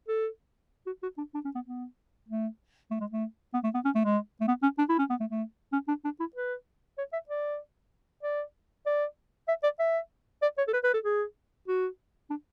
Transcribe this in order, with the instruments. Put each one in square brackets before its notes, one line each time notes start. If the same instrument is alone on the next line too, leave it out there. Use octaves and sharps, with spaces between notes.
[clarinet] A4
F#4
F#4
D4
D4
C#4
B3
B3
A3
A3
G#3
A3
B3
A3
B3
C#4
A3
G#3
A3
B3
C#4
D4
E4
C#4
B3
A3
A3
C#4
D4
D4
E4
B4
C#5
E5
D5
D5
D5
E5
D5
E5
D5
C#5
A4
B4
B4
A4
G#4
F#4
D4